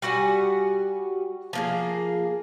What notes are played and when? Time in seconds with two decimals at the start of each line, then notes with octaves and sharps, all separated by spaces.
0.02 G3 F#4 F#5 G#5
1.53 F3 A#3 G#4